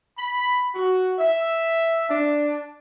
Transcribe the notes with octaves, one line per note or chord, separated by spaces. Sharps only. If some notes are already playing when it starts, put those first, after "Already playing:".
B5
F#4
E5
D4